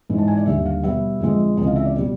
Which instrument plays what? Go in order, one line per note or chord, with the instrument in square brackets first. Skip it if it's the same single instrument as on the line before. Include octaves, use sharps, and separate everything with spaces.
[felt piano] G#2 E3 G#3
A5
G#5
D5
D#2 D3 G3 E5
F5
B2 G3 B3 E5
F2 D3 F3 G#3
C#2 C3 E3 D#5
F5
E5
D5
B2 G3